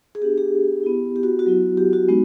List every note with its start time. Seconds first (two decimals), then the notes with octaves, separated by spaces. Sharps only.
0.15 G#4
0.21 B3 D4 F#4 G4
0.38 G4
0.83 B3 E4
1.16 G4
1.23 F#4
1.39 F#4
1.46 F#3 B3 E4
1.77 G4
1.93 F#4
2.09 G#3 B3 D#4 F#4